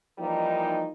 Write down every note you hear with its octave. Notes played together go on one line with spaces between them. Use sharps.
E3 F3 G3 A#3 D#4